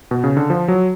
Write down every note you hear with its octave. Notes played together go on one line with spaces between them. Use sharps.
B2
C#3
D3
F3
F#3